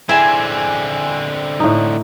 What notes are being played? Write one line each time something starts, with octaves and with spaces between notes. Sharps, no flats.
D3 C4 E4 G#4 E5 G#5
A2 D#4